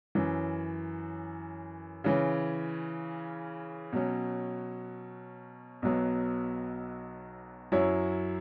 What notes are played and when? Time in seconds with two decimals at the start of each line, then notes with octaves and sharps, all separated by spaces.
0.15 F#2 E3 C#4
2.04 C#3 E3 C#4
3.93 B2 F#3 C#4
5.82 B1 B2 F#3 B3
7.72 F#2 F#3 E4 C#5